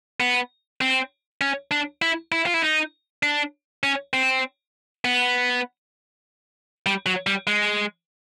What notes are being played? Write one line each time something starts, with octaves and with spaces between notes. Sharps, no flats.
B3
C4
C#4
D4
E4
E4
F4
E4
D#4
D4
C#4
C4
B3
G3
F#3
G3
G#3